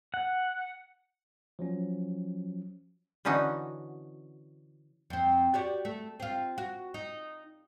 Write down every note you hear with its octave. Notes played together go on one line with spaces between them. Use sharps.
F#5
F3 F#3 C#4
D3 E3 C#4 D#4 F#4
F2 C4
F#4 G4 D5
A3
C4 F4
F#4
D#4